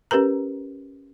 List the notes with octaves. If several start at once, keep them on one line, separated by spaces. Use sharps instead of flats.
C#4 G4 A#4 B4 A#5